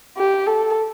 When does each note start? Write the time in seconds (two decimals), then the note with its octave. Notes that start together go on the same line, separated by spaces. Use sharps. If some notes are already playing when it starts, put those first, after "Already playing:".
0.17 G4
0.47 A4